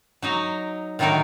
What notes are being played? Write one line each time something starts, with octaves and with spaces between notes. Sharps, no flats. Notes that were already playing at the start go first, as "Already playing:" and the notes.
F#3 D#4 D#5
A2 D3 D#3 F#3 D#4 A#4